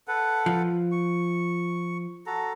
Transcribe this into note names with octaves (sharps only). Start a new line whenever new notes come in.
A4 B4 F#5
F3
C#6
F#4 A4 A#5